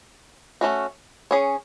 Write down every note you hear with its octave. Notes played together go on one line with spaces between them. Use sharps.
A3 C#4 F#4
C#4 G#4 C#5